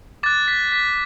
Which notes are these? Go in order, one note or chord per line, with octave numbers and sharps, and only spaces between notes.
D6 F#6 A6
B6
B6